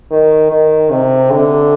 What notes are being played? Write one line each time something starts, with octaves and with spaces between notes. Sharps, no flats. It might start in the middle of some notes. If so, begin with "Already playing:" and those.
D#3
D#3
C3
D3